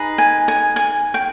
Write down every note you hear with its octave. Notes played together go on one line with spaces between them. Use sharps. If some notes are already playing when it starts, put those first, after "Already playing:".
Already playing: D#4 G#4 B4
G#5
G#5
G#5
G5